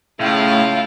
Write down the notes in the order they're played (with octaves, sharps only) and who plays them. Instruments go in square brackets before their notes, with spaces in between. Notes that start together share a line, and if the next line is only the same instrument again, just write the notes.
[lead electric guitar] A2 [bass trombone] C#3 [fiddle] E4 F4 [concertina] F5 G5